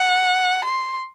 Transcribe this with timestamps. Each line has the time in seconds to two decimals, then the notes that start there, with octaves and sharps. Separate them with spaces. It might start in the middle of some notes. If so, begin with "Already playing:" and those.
Already playing: F#5
0.64 C6